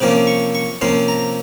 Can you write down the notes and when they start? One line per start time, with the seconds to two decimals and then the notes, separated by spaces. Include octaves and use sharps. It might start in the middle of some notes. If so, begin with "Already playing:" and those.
0.01 C3 F3 A#3 C#4 D6
0.27 C#6
0.55 C#6
0.81 C3 F3 A#3 C#4 C6
1.08 A#5